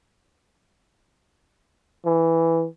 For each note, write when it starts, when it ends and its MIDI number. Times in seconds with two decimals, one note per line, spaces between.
2.05 2.66 52